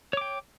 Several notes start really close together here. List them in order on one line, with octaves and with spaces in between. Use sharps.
C#5 D6 G5